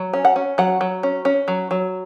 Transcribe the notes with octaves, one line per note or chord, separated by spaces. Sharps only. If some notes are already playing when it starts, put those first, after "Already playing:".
Already playing: F#3
C#4
F#5
C#4
F#3 F#5
F#3
C#4
C#4
F#3
F#3